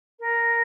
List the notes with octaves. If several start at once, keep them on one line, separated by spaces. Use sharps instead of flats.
A#4